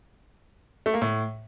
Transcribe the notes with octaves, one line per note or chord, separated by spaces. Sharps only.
A3
A#3
A2